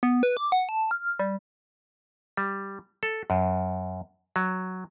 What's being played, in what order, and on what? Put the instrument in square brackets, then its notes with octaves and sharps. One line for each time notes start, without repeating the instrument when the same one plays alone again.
[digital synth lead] B3
B4
D6
F#5
A5
F6
G3
[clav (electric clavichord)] G3
A4
F#2
F#3